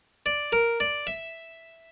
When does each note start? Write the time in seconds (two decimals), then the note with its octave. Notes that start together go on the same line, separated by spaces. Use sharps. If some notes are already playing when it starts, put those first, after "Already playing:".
0.26 D5
0.52 A#4
0.80 D5
1.07 E5